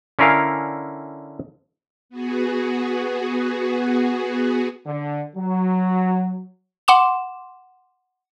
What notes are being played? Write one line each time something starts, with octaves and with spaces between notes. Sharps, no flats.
D3 C#4 E4 A#4 F5 G#5
B3 F#4 G#4
D3
F#3
F#5 C6 D6 E7